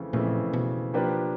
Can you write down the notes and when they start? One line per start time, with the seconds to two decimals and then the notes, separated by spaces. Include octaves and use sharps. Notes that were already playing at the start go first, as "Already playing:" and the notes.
Already playing: F2 C#3 E3 A3
0.13 F2 A#2 C#3 E3 A3
0.53 B2
0.94 F3 A#3 D4 G4 B4